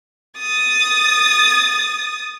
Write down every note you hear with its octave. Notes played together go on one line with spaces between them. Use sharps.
D#6 A6